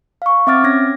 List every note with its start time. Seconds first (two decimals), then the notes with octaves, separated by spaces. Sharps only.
0.22 F5 C#6
0.47 C4 E5 D6 F6 A6
0.64 C#4 G#6 A#6